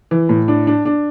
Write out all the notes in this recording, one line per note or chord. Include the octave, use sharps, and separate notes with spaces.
E3
A2
D4
D4
D4